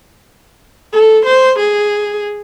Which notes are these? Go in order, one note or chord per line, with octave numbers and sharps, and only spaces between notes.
A4
C5
G#4